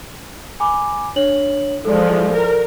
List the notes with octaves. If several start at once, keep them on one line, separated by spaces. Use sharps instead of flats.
G#5 B5 D6
D4 C#5 F#7
E3 F3 G#3 A4 D5
A#4